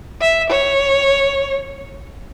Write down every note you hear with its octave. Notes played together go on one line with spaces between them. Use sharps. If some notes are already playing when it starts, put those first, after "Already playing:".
E5
C#5